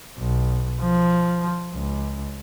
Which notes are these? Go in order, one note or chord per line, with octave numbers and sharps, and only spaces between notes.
B1
F3
C#2